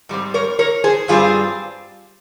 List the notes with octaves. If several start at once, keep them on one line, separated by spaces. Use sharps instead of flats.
G#2 G3 C4
A#4 C#5
A#4 C#5
G#4 C5
G2 G3 C4 F4 G#4